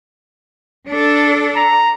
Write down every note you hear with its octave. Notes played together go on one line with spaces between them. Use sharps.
D4 A4
A#5